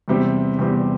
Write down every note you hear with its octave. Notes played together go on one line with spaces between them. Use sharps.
E2 C3 G3 C4 G4
E2 C3 G3 C4 G4